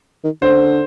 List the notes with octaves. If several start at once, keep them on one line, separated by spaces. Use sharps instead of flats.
D#3
D3 C5